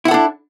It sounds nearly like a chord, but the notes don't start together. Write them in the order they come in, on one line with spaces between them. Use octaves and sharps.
E4 F#5 A4 D4